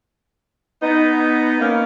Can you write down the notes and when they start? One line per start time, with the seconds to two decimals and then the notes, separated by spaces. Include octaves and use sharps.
0.82 B3 D#4
1.60 A#3 C#4